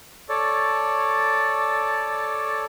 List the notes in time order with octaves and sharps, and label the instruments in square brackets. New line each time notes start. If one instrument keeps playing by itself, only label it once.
[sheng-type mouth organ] A4 C#5 D5